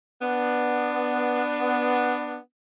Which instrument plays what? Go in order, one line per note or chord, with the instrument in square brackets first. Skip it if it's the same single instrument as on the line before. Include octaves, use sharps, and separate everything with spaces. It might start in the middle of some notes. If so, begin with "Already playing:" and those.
[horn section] B3 D4